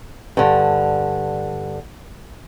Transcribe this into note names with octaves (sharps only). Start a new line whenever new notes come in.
G2 D3